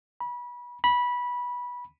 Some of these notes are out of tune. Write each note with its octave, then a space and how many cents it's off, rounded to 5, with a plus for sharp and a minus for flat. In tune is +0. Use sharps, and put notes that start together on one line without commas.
B5 -25
B5 -15